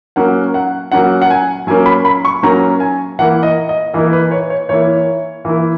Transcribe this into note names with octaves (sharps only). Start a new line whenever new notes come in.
F#3 A#3 C#4 F#5
F#5
F#3 A#3 C#4 F#5
F#5
G#5
F#3 A#3 C#4 G#5
B5
B5
C#6
F#3 A#3 C#4 A#5
G#5
E3 A#3 E4 F#5
D#5
D#5
E3 A#3 E4 D#5
B4
C#5
C#5
E3 A#3 E4 C#5
E3 A#3 E4